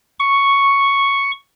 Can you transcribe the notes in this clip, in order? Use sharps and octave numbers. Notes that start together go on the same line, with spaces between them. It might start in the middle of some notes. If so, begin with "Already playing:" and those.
C#6